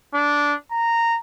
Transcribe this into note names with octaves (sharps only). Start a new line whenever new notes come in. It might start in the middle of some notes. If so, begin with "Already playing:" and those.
D4
A#5